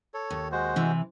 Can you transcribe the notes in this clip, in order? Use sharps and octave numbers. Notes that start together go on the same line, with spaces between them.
A4 C#5
D#2
G#3 F#4 C5
C3 E3